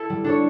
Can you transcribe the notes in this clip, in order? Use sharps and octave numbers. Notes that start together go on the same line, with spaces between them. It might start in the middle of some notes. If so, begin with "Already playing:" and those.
Already playing: E4 A4
G3
D4 A4 C#5